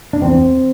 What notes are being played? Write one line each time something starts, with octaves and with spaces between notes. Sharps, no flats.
D4
E2 C4